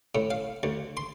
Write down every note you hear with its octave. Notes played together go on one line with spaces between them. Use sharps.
A2
F5
D2
C6